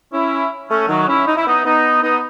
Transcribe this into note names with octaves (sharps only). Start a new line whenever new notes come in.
C#4 E4
A3 C#4
D#3 F#3
C#4 E4
D#4
E4
B3 D#4
B3 D#4
B3 D#4